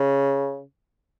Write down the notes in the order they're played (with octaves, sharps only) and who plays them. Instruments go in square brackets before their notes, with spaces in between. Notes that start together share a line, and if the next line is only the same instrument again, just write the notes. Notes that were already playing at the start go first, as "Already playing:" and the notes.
Already playing: [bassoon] C#3